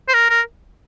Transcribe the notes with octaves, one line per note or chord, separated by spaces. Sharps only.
C5
A#4
A#4